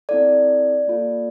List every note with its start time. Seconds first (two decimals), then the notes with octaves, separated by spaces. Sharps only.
0.09 C4 E4 A4 D5
0.87 A#3 F4 A4